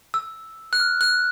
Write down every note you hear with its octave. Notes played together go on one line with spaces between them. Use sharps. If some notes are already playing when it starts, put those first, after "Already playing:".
E6
F#6
F6
F#6